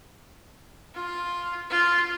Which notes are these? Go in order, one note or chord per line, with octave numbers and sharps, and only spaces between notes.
F4
F4